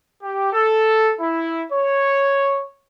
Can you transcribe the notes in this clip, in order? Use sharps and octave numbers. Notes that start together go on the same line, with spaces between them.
G4
A4
E4
C#5